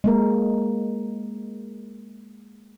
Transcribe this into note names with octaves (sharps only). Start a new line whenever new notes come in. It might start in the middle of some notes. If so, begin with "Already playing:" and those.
G#3 A#3 A#4